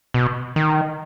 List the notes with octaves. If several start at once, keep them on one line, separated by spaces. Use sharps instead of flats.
B2
D#3